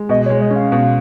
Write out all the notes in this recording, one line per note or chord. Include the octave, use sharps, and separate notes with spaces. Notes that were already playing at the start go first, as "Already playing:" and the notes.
Already playing: G#3
B2 D#5
G#3 C#5
D#5
C#4
F5
B2